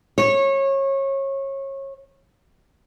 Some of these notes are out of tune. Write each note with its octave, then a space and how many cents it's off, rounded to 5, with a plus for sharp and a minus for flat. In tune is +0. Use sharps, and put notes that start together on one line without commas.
C#5 -25